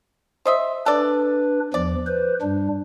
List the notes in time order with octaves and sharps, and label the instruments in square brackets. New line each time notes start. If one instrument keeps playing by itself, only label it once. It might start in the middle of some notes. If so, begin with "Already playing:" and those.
[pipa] C5 D#5 E5
[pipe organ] D4 B4 [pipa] A4 D5
[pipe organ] E2 F3 [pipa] D5
[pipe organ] B4 C5
G2 G3 D4